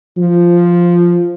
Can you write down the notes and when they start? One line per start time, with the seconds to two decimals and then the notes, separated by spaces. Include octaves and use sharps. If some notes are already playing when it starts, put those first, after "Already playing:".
0.18 F3